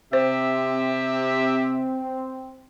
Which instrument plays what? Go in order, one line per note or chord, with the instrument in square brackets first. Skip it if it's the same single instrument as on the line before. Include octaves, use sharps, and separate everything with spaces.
[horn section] C3 G4 E5 [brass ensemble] C4 [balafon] C5